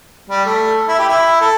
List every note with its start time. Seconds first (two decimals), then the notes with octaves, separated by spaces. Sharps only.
0.30 G3
0.46 A3
0.88 E4
0.99 G4
1.09 E4
1.41 A4